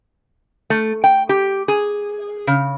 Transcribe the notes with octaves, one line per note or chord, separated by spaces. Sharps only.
A3
G5
G4
G#4
C#3